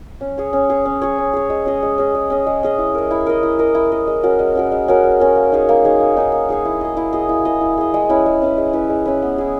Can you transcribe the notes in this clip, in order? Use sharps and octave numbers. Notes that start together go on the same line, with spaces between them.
C#4
G#4 C#5
C#4
G#4 C#5
C#4
G#4 C#5
C#4
G#4 C#5
G#3
C#4 G#4 D#5
G#3
C#4 G#4 D#5
G#3
C#4 G#4 D#5
G#3
C#4 G#4 D#5
E4
A#4 D#5
E4
A#4 D#5
E4
A#4 D#5
E4
A#4 D#5
G#3
C#4 F#4 A#4
G#3
C#4 F#4 A#4
G#3
C#4 F#4 A#4
G#3
C#4 F#4 A#4
A#3
D#4 G#4 C#5
A#3
D#4 G#4 C#5
A#3
D#4 G#4 C#5
A#3
D#4 G#4 C#5
E4
G#4 D#5
E4
G#4 D#5
E4
G#4 D#5
E4
G#4 D#5
G#3
C#4 E4 B4
G#3
C#4 E4 B4
G#3
C#4 E4 B4
G#3
C#4 E4 B4
B3
E4 G#4